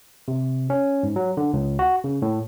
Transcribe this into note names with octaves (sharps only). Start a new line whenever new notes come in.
C3
C#4
G#2
F#3
D3
C#2
F#4
C#3
A2